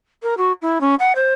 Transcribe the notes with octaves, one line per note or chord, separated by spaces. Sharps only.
A#4
F#4
E4
C#4
F#5
C5